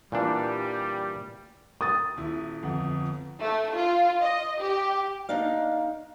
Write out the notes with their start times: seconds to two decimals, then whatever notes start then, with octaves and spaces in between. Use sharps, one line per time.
0.12 A#2 E3 G3 D4
1.81 D#6 A6
2.17 D#1 E4
2.63 G1 F2 F#5
3.41 A3
3.75 F4
4.20 D#5
4.61 G4
5.29 A#3 D4 D#4 F5